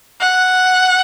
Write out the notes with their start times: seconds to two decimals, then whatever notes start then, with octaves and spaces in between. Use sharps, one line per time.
0.20 F#5